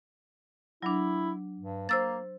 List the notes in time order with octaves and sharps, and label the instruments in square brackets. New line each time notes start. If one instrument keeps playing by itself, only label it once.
[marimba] F#3 D4 [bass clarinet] E4
[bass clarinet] G2
[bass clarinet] A#3 [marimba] C5 E6 A6